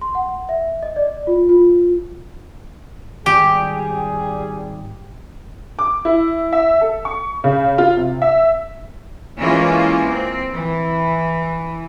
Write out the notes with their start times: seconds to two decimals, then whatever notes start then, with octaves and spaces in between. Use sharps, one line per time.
0.01 C6
0.15 F#5
0.49 E5
0.83 D#5
0.96 D5
1.27 F4
1.49 F4
3.26 G#2 D#3 G3 G4 G#4
5.79 D6
6.05 E4
6.53 E5
6.81 A4
7.05 C#6
7.44 C#3
7.78 F4
7.97 C3
8.22 E5
9.39 E3 G#3 A#3 C#4 F4
10.09 C4
10.51 E3